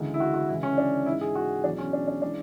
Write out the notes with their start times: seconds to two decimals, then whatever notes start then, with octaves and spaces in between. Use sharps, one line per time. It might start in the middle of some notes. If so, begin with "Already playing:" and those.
Already playing: D2 C#3 E3 G#3
0.14 E4
0.20 F#4
0.34 F#4
0.48 C#2 C#3 E3 G#3 E4
0.63 C#4
0.78 D4
1.06 G#2 E3 G#3 E4
1.21 G#4
1.35 F#4
1.64 E2 B2 F#3 D4
1.78 C#4
1.93 D4
2.08 D4
2.22 E3 G#3 D4